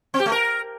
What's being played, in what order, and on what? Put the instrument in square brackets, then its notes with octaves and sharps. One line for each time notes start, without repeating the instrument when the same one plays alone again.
[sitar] C4
G4
A3
A#4